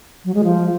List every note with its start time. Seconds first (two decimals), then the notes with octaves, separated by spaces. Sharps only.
0.25 F#3
0.34 G#3
0.44 F3